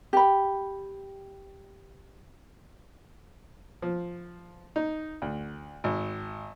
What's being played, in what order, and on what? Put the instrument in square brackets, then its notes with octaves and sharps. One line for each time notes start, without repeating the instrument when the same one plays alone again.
[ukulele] G4 B5
[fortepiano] F3
D#4
D2
G#1